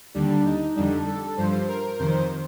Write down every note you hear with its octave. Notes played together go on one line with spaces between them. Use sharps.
D#2 D3 G3 D4
D#4
F2 D3 G3 D4
A4
G2 F3 C5
A#4
F2 C3 D#3 C5